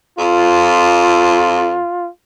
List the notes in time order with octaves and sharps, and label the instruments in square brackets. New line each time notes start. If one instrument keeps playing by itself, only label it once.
[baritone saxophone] F2 [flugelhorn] F4